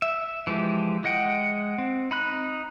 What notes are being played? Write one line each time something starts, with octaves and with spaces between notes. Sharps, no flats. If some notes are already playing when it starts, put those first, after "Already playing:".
E5
E3 F3 G#3 G4
G#3 D#5 F#5 G5
C4
D#4 B5 F#6